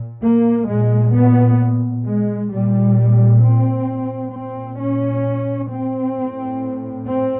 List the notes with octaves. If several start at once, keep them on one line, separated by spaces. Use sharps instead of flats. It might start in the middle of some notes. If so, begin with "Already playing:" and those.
Already playing: A#2
A#3
A#2 G#3
B3
G#3
A#2 G3
C4
A#2 C4
C#4
C4
A2
C4